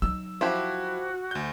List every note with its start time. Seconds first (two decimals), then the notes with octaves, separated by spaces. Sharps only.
0.02 F#3 D#4 E6
0.41 F3 E4 F#4 G4
1.31 D2 G6